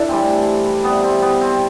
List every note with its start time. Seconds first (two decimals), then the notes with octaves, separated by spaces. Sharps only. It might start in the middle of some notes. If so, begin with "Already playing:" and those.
Already playing: D4 E4 A4
0.09 A2 E3 G3 C4
0.84 C3 G3 B3
1.03 C4
1.22 B3
1.41 C4